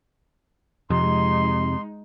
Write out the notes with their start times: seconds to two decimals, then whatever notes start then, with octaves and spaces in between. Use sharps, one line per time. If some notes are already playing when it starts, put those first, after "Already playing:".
0.90 F2 C3 G#3 D#4 C6